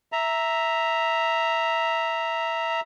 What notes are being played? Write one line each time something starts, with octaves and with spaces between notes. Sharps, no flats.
E5 A#5